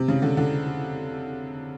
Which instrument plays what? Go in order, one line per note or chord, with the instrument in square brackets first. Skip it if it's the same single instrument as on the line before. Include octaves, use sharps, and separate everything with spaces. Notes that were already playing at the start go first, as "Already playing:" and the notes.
Already playing: [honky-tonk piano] C3
C#3
D3
D3